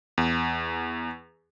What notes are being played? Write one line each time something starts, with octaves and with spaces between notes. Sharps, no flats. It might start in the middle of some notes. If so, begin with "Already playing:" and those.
E2